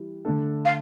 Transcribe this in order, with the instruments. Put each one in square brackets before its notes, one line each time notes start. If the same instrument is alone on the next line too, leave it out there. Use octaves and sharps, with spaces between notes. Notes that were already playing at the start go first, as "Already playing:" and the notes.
Already playing: [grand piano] E3 G3
D3 A3 D4 A4
[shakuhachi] F5